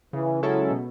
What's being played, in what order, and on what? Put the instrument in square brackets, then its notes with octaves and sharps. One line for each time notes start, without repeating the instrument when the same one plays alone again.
[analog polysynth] C#3 [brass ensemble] E3
[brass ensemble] F#3 [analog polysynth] G#3 C#4 E4 A4
[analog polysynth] B2